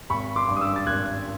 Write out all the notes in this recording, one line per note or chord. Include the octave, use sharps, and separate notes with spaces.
G#1 B5 C#6
C6 D6
G2
D#6
D6 E6
A6
G#1 F#6 G#6